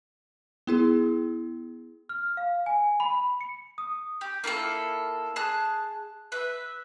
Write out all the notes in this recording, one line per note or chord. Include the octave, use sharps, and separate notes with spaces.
B3 E4 G#4
F6
F5
G#5
B5
C#7
D#6
G4
A#3 E4 F4 A4
G#4 A5 F#6
B4 E5